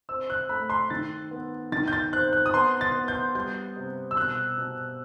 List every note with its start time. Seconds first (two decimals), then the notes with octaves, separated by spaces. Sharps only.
0.09 C4 E6
0.30 F#6
0.49 A3 B5
0.70 C6
0.90 D#3 A6
1.31 B3
1.72 D#3 A6
1.88 G6
1.93 A6
2.13 C4 F#6
2.33 F#6
2.46 D#6
2.54 B3 C6
2.81 A6
2.94 B3
3.08 G6
3.35 G3 G6
3.77 C3
4.11 E6
4.17 B2 F#6
4.58 B2